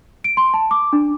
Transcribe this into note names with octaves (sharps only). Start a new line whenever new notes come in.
D7
C6
A5
D6
D4